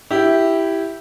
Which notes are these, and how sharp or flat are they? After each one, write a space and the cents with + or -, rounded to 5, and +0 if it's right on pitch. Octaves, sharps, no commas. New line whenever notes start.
E4 +0 G4 -5